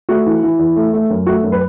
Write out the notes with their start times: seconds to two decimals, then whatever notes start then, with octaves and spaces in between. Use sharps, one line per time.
0.09 A3 F#4
0.26 E3
0.43 E3
0.59 E2
0.76 A3
0.93 A3
1.10 F#2
1.27 A3 F#4
1.43 F#2
1.52 B4